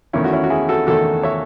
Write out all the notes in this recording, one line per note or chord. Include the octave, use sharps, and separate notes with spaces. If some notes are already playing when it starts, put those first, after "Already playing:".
E2 D#3 A3 C#4 E4
F#4
C#4 E4
F#4
E4 G#4
F#4 A4
E2 D#3 A3 F#4 A4
C#5 E5